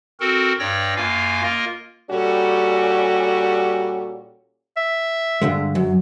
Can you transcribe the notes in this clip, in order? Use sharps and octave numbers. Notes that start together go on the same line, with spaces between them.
C4 F#4 A4 A#4
G2 C#5 D5 G5 A#6
F#2 A#3 F4 F5 G#5
A#3 F4 A#4 D#5
A#2 G3 C#4 F#4 G4 A4
E5
G2 D3 G#3
F#2 F#3